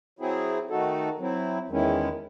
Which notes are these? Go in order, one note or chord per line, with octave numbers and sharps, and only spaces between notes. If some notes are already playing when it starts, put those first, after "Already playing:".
F#3 C4 E4 G#4
D#3 A3 D#4 F#4 A4
F#3 C4 E4
E2 D#3 G#3 C#4 E4